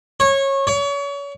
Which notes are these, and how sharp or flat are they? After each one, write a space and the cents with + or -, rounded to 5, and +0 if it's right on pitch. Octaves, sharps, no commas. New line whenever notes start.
C#5 -20
C#5 +35